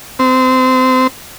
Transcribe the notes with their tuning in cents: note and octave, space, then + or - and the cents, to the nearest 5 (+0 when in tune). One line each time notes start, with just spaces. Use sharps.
C4 -25